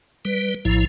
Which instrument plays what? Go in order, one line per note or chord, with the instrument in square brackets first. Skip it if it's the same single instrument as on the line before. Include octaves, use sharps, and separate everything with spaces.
[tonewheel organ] G3 B4
A#1 A2 F3 E4